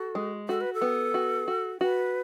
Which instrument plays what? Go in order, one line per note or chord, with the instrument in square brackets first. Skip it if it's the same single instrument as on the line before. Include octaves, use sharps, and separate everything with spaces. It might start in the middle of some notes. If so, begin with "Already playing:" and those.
Already playing: [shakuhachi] F#4 [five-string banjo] A4
[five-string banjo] G#3
[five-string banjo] F#4 [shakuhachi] A4
[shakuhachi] B4
A4
[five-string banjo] B3
F#4
F#4
[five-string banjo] F#4 [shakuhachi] B4